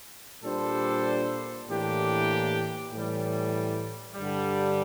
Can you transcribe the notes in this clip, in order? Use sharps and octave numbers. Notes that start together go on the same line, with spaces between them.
A#2 G3 D4 A4 C5
A2 E3 A#3 D4 G4
A2 E3 G3
G2 D3 G3